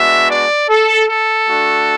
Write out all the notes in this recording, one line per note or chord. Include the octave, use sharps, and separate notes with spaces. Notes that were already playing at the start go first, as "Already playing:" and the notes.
Already playing: G#3 B3 D4 F#4 E5
D5
A4
A4
A3 D4 F#4